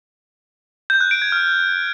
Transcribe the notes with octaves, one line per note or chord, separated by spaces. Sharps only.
G6
F#6
D7
G#6
F6